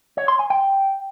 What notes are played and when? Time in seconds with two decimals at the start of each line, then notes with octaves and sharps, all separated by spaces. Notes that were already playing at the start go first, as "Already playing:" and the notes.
0.17 C#5
0.28 C6
0.39 G#5
0.50 G5